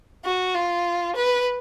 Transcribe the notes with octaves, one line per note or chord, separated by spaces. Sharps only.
F#4
F4
B4